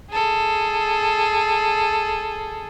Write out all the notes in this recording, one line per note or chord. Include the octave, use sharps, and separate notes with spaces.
G#4 A4